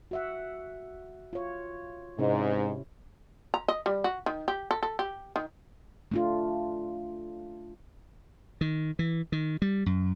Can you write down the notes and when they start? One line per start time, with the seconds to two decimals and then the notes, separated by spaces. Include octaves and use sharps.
0.11 F#4 E5 F#5
1.33 F4 C#5
2.19 G#2 C3 C#4 E4
3.54 A#5
3.68 D#5
3.86 G3
4.04 F#4
4.26 D#3
4.48 G4
4.71 A4
4.83 A4
4.99 G4
5.36 D#3
6.12 A3 D4 F4
8.61 D#3
8.99 E3
9.32 D#3
9.62 G3
9.86 F#2